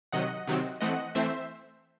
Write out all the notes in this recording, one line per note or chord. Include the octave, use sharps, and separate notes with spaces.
C3 D#3 F#3 D#5 F#5
C3 D#3 F#3 C4
E3 A3 C4 D#5 F#5
E3 A3 C4 C5 E5